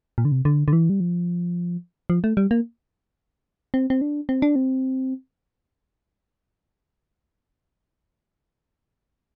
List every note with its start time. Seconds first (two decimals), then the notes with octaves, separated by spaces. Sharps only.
0.18 A#2
0.25 D3
0.32 C3
0.45 D3
0.68 D3
0.73 E3
0.90 G3
1.00 F3
2.10 F3
2.24 A3
2.37 G3
2.51 A#3
3.74 C4
3.90 C4
4.01 D4
4.29 C4
4.42 D4
4.56 C4